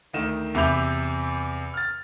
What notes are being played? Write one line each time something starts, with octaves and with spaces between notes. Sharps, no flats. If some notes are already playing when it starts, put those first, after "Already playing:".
D2 D#3 E7
E2 C3 E5 B5 G6 F7
F6 A6